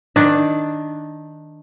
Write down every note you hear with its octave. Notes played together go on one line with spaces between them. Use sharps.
D#3 D4